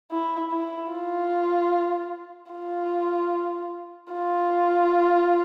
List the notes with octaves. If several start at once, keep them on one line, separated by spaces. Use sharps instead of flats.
E4
E4
F4
F4
F4